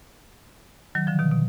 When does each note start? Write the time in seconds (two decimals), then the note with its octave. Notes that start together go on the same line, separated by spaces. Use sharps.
0.95 D#3 F#3
1.07 D3 F3
1.19 B2 D#3
1.31 B2